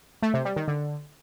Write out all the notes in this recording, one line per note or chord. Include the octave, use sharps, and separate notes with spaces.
A3
C3
G3
D#3
D3